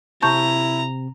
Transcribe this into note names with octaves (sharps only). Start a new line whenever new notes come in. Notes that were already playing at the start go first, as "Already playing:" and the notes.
C3 C4 E4 A5 A#5 C#6 G6